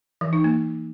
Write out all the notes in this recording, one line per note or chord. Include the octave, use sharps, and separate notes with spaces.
E3
D#4
A#3